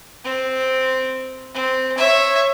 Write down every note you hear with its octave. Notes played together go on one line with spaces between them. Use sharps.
C4
C4
C#5 E5